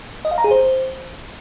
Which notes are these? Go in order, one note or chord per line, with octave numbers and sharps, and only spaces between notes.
D#5
F5
A#5
G#4
C5